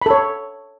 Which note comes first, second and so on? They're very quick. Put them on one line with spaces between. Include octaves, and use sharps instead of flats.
B5 A4 C#5